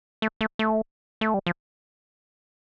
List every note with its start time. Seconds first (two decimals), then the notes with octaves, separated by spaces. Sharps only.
0.22 A3
0.41 A3
0.59 A3
1.21 A3
1.34 G3
1.47 F3